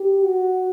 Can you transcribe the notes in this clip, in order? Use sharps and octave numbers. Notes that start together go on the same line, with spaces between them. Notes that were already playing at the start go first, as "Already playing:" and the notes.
Already playing: G4
F#4